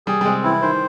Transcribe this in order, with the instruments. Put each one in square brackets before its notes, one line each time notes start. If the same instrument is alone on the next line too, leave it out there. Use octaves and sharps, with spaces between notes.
[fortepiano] G3 [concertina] G#4
[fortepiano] G3
[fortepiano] G#3 [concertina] C4
[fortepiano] E3 [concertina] E4
[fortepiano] D#3 [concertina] C5